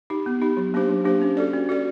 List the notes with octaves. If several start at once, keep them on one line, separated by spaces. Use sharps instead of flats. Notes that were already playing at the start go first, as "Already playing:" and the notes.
D#4 G4
B3
D#4 G4
F#3
A#3 D4 G4 C5
F#3
A#3 D4 G4 C5
C#4
F#4 A4 D5
C#4
F#4 A4 D5